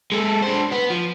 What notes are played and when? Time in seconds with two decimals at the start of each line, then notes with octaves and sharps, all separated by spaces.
0.12 G#3 A4
0.43 D4 C5
0.72 B3
0.90 F3